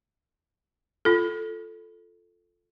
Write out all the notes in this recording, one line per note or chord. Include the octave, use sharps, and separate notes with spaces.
F4 A4